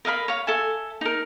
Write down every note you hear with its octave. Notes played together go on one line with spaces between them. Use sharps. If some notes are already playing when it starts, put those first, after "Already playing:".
A#4 D#5 F5 B5
C#5 F5
A4 E5 G#5
D#4 A#4